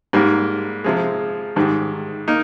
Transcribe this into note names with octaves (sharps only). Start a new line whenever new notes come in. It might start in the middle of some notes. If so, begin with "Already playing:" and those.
G#2 G3 A#3
C3 F3 G#3
G#2 D#3 G3
A#3 D#4